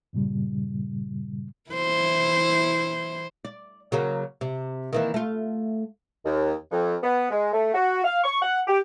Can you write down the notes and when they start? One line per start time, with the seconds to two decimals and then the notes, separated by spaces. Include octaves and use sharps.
0.13 G2 A#2 C#3 G3
1.71 E3 E4 C5
3.45 D5
3.92 C#3 F#3 A#3
4.41 C3
4.93 D#3 E3 A#3
5.14 A3 F4
6.25 D#2
6.71 F2
7.03 B3
7.31 G#3
7.53 A3
7.74 F#4
8.04 F5
8.24 C#6
8.42 F#5
8.67 G4